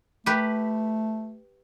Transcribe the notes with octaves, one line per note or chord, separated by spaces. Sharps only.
A3 G4 B4